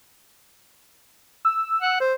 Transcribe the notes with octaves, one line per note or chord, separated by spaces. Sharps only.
E6
F#5
C5